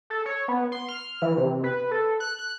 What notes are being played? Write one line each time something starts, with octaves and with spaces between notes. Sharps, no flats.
A4
C#5
B3
C6
F6
E3
C3
B4
A4
F#6
F#6